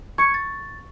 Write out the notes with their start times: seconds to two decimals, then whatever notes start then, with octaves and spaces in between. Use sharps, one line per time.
0.18 C#6 G#6 C#7
0.34 A6